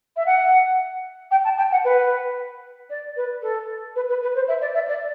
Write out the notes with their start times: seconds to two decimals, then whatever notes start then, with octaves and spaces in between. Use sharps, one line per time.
0.16 E5
0.26 F#5
1.31 G5
1.44 A5
1.58 G5
1.72 F#5
1.84 B4
2.90 D5
3.16 B4
3.42 A4
3.96 B4
4.09 B4
4.22 B4
4.35 C5
4.48 E5
4.61 D5
4.74 E5
4.88 D5